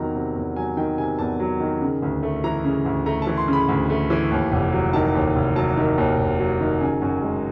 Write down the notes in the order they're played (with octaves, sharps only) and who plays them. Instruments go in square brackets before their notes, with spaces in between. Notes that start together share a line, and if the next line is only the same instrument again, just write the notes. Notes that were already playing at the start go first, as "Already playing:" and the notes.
Already playing: [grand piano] E2 C3 D#3 F#3 A#5
C3
E2
F#3 G#5
D#3 G5
C3 G#5
E2 A5
F#3
D#3
C#3
D2
A3
E3 A#5
C#3
D2
A3 A#5
A5
E3
C6
C#3 B5
D2
A3
E3
D#2
F1
F#3
D#3 A5
D#2
F1
F#3 A5
D#3
D#2
F1
F#3
D#3
C#3 G#5
F#2
G#3